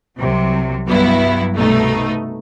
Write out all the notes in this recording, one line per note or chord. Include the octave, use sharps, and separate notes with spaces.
C2 C3 F#3
G2 F#3 B3 E4
C2 B2 A3 D#4